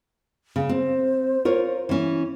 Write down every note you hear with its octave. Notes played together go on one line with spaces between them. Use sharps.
C#3
C4 C5
F4 A#4 C#5
E3 C#4